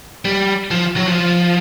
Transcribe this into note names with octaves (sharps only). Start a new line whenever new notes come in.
G3
F3
F#3
F3